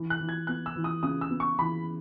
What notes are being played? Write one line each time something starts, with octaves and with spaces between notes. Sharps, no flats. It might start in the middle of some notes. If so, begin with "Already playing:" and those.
Already playing: E3
F#6
E3
G#6
B3 F#6
E6
E3
D#6
C#3 D#6
E6
B3
C#6
E3 B5